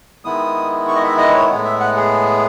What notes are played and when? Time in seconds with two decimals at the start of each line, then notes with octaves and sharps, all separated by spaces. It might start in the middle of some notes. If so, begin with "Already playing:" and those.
0.25 D#3 G#3 B3 E4 D#6
0.88 C#6
0.96 D#5
1.03 E5
1.18 D#5
1.29 B4
1.34 C#5
1.49 A2 G#3 B3
1.64 E5
1.80 F#5
1.96 G#4